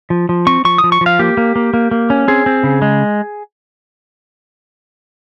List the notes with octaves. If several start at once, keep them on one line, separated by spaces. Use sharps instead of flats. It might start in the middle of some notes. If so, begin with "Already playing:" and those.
F3
F3
C4 C#6
F3 C#6
D#6
F3
C#6
F3
F5
A#3 G4
A#3
A#3
A#3
A#3
C#4
C4 G#4
C4
C#3
G#3